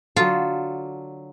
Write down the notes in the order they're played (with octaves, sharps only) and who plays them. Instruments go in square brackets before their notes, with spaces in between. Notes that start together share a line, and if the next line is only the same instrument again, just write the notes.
[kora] D3 F#3 A4 [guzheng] F4